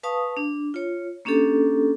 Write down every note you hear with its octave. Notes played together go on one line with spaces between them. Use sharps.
B4 F5 A5 C#6 D#6
D4
F4 C#5
A#3 C#4 D4 G4 A4